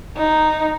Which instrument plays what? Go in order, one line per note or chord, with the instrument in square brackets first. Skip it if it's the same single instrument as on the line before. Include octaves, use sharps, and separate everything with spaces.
[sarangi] D#4